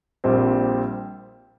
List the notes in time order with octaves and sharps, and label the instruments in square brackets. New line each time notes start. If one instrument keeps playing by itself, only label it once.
[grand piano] A#1 A#2 G3 C4